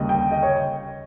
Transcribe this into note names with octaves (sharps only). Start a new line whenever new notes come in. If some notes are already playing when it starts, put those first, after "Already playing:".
Already playing: D#2 C#3 G3 A#3 D#5
G5
D#5
C#5